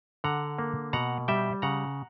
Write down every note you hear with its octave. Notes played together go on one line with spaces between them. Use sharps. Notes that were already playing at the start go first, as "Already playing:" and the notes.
D3 F#5 A#5
A#3
B2 F#5 A#5
G3 E5 G5
C#3 F#5 A#5